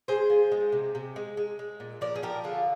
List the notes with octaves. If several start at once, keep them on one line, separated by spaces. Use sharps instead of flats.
G#3 G#4 C5
F3
G#3
C3
C3
G#3
G#3
G#3
A#2
F3 A#4 D5
G#4
F3 G4 A#4
D3 F4 G#4